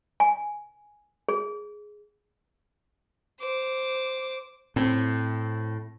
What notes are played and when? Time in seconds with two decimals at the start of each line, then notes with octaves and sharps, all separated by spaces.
0.20 G#5
1.29 G#4
3.40 C5 D6
4.76 A2 C4